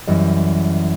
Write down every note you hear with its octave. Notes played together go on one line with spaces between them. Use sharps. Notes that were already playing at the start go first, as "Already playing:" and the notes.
F#2 E3 G3 D#5